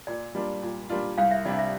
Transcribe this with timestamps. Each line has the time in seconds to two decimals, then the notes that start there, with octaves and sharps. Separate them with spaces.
0.07 A#2 D5
0.35 G3 A#3 D4 F4
0.63 A#2
0.90 G3 A#3 D4 F4
1.18 C2 F5
1.31 E5
1.45 C3 G3 D4 D5
1.58 E5